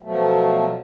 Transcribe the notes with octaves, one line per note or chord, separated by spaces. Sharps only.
B2 F3 F#3 A3